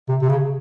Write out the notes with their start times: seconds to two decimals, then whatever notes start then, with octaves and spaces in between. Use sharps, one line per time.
0.08 C3
0.22 C3
0.29 C#3